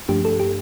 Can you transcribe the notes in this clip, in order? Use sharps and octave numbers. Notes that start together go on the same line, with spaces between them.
G2 F3 A3 D4 G4
A4
G4